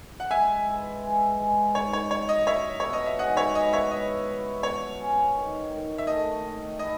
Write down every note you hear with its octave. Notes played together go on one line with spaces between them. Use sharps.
F#5
G#3 E5 G#5
E3
G#3
G#3
D#4 C#5
C#5
F#3 C#5
D#5
F#3 C#5 E5
B2 C#5
D#5
E5
G#2 D#5 F#5
C#5 E5
E3 D#5
C#5 E5
B4 D#5
E4
B2 C#5
C#4
D#3
D#3
E5
A3 D#5
D#3
E4 D#5